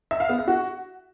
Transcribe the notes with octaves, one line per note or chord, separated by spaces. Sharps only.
E5
F5
B3
E5
F#4